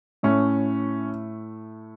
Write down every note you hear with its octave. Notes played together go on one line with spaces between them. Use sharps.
A2 A3 C#4